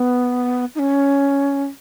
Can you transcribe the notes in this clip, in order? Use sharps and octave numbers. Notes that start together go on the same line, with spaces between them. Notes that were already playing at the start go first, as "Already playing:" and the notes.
Already playing: B3
D#4
C#4